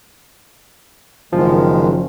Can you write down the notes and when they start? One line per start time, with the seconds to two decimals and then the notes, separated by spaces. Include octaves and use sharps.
1.33 F#1 D#3 F3 G#3